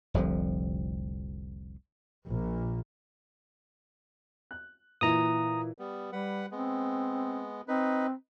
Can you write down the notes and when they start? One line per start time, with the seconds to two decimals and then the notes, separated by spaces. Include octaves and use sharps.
0.14 F1 C2 D3 F3
2.27 A#1 A#2
4.51 F#6
5.01 A#2 E3 E4 A#5 D#6
5.78 G3 B3
6.13 G3 B4 F#5
6.52 G#3 B3 C4
7.68 C4 D#4 B4